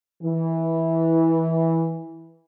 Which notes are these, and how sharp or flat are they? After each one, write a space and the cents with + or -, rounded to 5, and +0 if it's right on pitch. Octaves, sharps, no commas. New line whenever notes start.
E3 -10